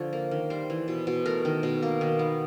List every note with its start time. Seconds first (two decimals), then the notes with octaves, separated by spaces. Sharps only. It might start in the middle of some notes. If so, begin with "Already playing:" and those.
Already playing: D3 F3 C#5
0.13 A#3
0.31 D#3
0.50 G3 C5
0.70 E3
0.88 B2
1.07 B2
1.26 A3 A#4
1.45 D#3
1.63 B2
1.82 A#3
2.01 D#3
2.19 B3